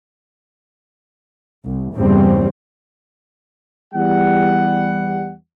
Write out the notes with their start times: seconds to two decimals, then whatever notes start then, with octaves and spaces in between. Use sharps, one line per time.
1.64 C2
1.95 E2 G2 A#2 C#3 G3 C4
3.93 E2 G3 F#5